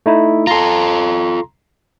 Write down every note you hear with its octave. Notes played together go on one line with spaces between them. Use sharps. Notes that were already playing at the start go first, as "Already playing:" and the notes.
A3 D#4 E4
F4 A4 A#5 C6